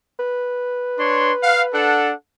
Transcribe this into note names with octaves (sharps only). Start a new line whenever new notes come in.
B4
D4 C#5 C6
F5 F#5
D4 A4 F#5